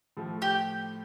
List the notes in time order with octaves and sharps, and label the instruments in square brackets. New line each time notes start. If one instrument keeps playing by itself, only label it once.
[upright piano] A2 F3 A3
[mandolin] G4